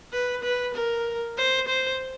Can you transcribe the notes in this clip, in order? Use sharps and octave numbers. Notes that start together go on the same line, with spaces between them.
B4
B4
A#4
C5
C5